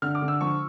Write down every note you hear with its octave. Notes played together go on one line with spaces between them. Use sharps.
D3 F6
D6
D3
E6
F3 C#6